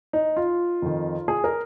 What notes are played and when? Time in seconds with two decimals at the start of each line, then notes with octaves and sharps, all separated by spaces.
0.13 D#4
0.37 F4
0.82 F2 D#3
1.28 G#4
1.44 A#4